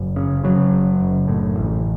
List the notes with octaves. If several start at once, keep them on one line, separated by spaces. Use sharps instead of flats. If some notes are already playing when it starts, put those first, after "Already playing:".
Already playing: F#1 F#2
C#3
C#3 F#3
F#1
F#1
A2
A1